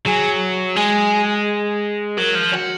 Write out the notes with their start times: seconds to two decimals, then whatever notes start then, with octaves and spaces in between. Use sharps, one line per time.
0.06 F#3 G#4
0.76 G#3 G#4
2.18 F#3 A#4
2.35 F3
2.53 F#4